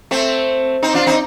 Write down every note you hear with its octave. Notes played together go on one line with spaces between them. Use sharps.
A3 C4
C4 D#4
D4 F4
C4 D#4